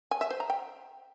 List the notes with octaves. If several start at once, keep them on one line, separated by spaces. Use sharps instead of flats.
G#5
E5
C5
A#5
G5